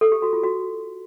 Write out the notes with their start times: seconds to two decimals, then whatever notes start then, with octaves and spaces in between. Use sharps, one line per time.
0.01 A4
0.12 G4
0.22 F#4
0.33 F4
0.44 F#4